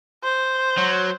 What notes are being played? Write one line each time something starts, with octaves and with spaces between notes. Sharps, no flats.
C5
F#3